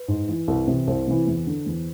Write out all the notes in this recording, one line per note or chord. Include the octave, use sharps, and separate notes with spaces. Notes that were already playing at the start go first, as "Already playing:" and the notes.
Already playing: B4
G#2
E3
C2
C3 E3
C2 C5
C3 E3
E2
D3
E2